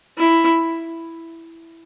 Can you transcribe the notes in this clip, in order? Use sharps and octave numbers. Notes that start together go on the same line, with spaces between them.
E4